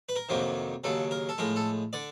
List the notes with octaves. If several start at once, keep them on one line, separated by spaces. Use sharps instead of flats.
B4
A#4
F2 C3 D#3 F#3 A#3
D#2 C#3 F#3 A4
A#4
A4
A2 F3 G#3 A#4
A4
D3 D5